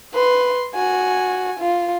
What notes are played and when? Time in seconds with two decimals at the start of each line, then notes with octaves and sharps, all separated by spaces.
0.14 B4 C6
0.75 F#4 G#5
1.59 F4